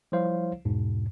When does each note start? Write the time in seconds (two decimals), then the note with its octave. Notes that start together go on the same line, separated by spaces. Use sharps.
0.12 F3 G3 E4 C5 C#5 F5
0.65 E2 G#2 B2